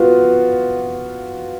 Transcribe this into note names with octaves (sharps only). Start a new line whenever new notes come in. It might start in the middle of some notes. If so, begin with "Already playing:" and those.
Already playing: B3 F4 F#4